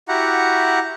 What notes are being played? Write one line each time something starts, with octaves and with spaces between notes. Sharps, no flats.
E4 F#4 G4 F#5 A#5